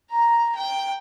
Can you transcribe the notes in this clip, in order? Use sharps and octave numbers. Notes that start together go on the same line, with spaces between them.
A#5
G5